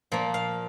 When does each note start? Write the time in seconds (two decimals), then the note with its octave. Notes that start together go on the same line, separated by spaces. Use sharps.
0.12 A#2 F3 A#3
0.34 F5